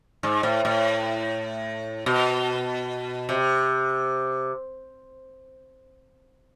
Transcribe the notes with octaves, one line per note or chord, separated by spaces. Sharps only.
G#2
A2
A2
B2
C3